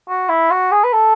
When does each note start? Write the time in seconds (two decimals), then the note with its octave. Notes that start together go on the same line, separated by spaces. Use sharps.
0.08 F#4
0.29 E4
0.51 F#4
0.72 G#4
0.84 B4
0.93 A4